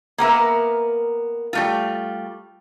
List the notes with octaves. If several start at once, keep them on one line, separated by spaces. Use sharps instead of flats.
A#3 B3 A#4 E5
G3 A3 F4